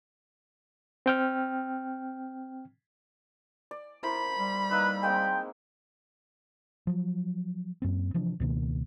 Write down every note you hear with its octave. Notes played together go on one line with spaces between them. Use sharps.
C4 G5 F6
D5
E4 A#4 C5 B5
G3
A#3 D#4 B4 E6
G#3 A#3 C4 G5
F3 F#3
F#2 A#3 C4
C3 E3 F3 D4
C#2 B2 D#3 A#3